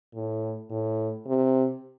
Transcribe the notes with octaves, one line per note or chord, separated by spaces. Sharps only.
A2
A2
C3